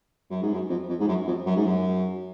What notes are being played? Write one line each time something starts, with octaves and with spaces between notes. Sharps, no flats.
F#2
G#2
F#2
F2
F2
G#2
F#2
F2
F#2
G#2
F#2